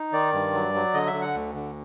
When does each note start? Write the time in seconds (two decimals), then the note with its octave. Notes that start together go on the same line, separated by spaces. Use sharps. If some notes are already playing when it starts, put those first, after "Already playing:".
Already playing: D#4
0.13 D#3 D5
0.33 G2
0.54 F#3
0.74 F#3
0.94 D3 D#5
1.07 E5
1.14 D3
1.21 F#5
1.34 D2
1.55 D3